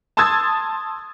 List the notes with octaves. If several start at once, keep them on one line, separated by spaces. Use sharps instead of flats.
A5 C6 D#6 E6 G#6 A6